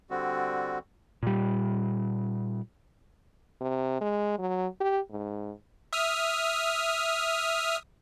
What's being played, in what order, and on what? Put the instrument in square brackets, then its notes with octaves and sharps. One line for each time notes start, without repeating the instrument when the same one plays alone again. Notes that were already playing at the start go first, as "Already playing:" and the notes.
[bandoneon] D3 G3 C4 F#4
[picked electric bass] A#2 G3
[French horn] C3
G#3
F#3
G4
G#2
[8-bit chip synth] E5 D#6 F6